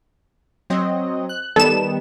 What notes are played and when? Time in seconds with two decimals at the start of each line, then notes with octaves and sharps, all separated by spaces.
0.70 F#3 C4 D#5
1.29 F#6
1.56 D#3 G3 B3 A4 E7